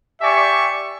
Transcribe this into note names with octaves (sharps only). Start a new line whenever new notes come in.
G4 D5 E5 G#5 C#6